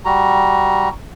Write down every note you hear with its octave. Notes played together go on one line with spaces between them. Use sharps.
G3 F#4 A#5